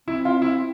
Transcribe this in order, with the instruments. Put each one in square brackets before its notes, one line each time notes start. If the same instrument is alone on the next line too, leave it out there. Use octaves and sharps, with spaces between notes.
[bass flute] C4 [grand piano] E4
[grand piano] F4
E4